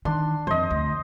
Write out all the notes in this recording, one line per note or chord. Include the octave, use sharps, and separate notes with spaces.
D#3 D4 C6
F2 C5 D#5
D2